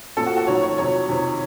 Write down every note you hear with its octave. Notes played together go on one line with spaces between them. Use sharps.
A#2 F3 A4
F#4
F#4
F2 D#3 F#3 C#5
C#5
F2 C3 F#3 C#5
F2 C3 D#3